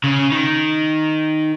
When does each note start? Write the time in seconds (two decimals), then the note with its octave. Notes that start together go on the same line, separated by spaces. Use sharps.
0.04 C#3
0.32 D#3